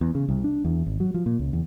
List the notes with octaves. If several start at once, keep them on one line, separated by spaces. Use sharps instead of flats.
E2
C#3
C2
D4
E2
G#1
F#3
F3
A#2
C#2
E2